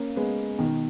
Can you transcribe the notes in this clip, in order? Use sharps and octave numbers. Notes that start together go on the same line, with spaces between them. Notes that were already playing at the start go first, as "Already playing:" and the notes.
Already playing: A#3 C#4
G#3 B3
B2 D#3